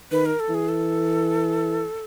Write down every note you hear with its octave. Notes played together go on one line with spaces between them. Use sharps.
D#3 B4
A#4
A4
E3
G#4
A4